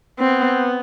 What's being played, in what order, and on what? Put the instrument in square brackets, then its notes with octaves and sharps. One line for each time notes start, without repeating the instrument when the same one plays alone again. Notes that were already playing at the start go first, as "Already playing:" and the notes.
[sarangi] B3 [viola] C4